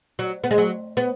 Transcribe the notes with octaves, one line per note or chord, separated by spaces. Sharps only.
F#3
B3
G#3
F#3
B3